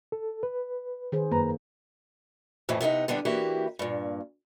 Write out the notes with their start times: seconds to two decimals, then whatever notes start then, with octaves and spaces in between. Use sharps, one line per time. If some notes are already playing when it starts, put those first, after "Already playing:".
0.12 A4
0.43 B4
1.12 D#3 G#4 C5
1.32 F#2 A#3 B4 A#5
2.69 F2 A2 E3 F3
2.81 C3 B3 C#4 D#4
3.08 D3 G3 B3 D4
3.25 E3 A#3 E4 F#4 G4
3.79 G2 A#2